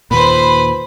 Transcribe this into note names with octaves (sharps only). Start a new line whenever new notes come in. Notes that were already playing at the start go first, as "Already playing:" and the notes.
D#2 A#2 B4 C5 B5